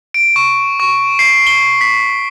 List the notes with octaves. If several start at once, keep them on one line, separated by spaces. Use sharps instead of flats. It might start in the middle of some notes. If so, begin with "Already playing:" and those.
D7
C#6
C#6
C7
G7
B6